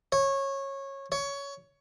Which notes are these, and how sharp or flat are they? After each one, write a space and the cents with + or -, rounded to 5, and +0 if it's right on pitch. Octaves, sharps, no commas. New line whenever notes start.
C#5 -20
C#5 +15